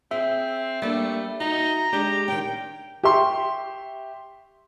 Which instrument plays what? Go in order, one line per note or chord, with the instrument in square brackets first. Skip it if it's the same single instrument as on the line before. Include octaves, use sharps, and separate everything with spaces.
[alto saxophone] C4 [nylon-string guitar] G#4 [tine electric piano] E5
[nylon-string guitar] G3 A#3 D4 [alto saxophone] A3
[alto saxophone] D#4 [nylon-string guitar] F#4 [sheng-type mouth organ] A#5
[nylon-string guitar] G#3 D4 [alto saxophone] G4
[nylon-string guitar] D#3 C#4 [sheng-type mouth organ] G5
[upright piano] G4 E5 C6 C#6